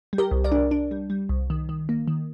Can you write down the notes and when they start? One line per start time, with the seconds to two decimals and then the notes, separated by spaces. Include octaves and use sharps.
0.13 G3
0.18 G4 A#4
0.31 C2
0.44 A#4 D5
0.52 D4
0.71 D4
0.91 G3
1.10 G3
1.29 C2
1.50 D#3
1.69 D#3
1.89 A#3
2.08 D#3